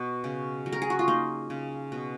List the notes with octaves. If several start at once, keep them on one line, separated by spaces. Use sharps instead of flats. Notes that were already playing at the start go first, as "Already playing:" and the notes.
Already playing: B2
C#3
F#3
A#4
G#4
F#4
F4
A#3 D#4
C#3
B2